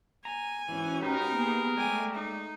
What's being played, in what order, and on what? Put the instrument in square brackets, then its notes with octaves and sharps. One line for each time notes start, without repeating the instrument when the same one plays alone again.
[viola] G#5 [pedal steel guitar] A#5
[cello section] G#2 C#4 F#4 [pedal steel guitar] E3
[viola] D#4 [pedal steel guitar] G4 B4 [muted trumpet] A#4
[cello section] A#3 B3 G#4
[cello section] G#3 A3 [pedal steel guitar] D5 G5 [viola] G#5
[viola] D#4